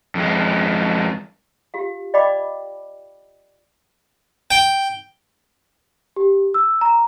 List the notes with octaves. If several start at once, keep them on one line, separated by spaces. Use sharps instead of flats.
F2 G#3
F4 G4 F5
D5 D#5 F5 G5 B5 D6
G5
G4
E6
A#5